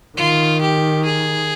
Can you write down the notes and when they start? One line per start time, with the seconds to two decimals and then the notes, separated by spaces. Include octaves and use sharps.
0.17 D#3 F4
0.61 G4
1.05 G#4